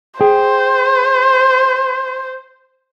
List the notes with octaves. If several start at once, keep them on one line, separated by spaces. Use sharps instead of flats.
G#4 C5 G5